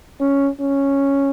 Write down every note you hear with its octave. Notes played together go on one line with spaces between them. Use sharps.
C#4
C#4